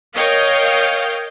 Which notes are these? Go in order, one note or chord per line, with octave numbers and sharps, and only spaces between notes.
A#4 C#5 D#5 F5 G5